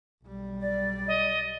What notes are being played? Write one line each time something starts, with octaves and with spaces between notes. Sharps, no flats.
B1 G3
D5
D#5